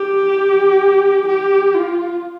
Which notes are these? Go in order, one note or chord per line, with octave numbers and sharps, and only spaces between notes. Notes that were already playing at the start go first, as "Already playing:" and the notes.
Already playing: G4
G4
F4